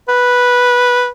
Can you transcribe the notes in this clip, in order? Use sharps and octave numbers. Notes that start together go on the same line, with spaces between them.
B4